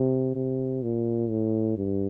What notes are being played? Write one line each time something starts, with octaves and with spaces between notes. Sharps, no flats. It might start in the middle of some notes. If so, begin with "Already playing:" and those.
Already playing: C3
C3
A#2
A2
G2